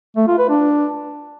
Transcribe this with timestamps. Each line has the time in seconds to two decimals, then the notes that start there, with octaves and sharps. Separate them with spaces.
0.17 A3
0.28 F4
0.39 B4
0.50 D4